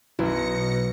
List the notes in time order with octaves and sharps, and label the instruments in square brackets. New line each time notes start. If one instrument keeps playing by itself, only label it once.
[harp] B1 [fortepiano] F#2 E4 [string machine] B2 A#6 C#7